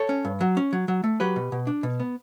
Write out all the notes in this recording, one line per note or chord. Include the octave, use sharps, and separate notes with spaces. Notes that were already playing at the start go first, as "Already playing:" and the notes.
Already playing: A4 C#5
C#4
G2
F#3
C#4
F#3
F#3
A3
F#3 G4 B4
B2
B2
D4
B2
B3